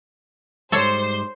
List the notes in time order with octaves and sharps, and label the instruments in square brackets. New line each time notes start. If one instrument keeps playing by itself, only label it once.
[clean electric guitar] G#2 G3 G#3 [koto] A4 C#5 [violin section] C5